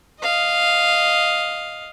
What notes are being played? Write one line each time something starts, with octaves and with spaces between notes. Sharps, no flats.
D#5 F5